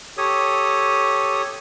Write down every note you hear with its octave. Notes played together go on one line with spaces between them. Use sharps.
G4 A4 C#5 D#6